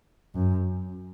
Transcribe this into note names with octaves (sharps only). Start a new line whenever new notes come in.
F#2